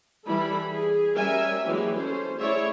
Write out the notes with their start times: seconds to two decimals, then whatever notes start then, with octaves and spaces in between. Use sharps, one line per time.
0.25 E3 G3 E4 A4 B5
0.71 G#4
1.17 G3 C#4 A#4 E5 G#5
1.66 E3 F#3 G#3 A#3 G4
1.97 C#4 A4 C5
2.39 A3 E4 G#4 C#5 D5 E5